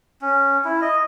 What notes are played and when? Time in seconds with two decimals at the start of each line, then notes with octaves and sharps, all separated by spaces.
0.22 C#4
0.65 E4
0.81 D#5